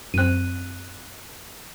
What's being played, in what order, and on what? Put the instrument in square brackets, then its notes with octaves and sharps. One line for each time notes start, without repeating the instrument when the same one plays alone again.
[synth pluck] F#2 C4 [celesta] F#6 D#7